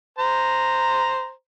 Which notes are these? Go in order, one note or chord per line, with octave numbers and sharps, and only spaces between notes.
C5 A#5